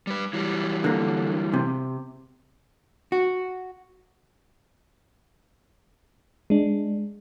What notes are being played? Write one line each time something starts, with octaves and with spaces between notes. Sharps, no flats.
G3 B4
E3 F#3 G3
D3 A#3
C3
F#4
G#3 D4